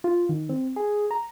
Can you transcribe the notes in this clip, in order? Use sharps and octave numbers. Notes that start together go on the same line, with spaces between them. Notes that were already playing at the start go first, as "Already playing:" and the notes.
F4
D#3
C4
G#4
A#5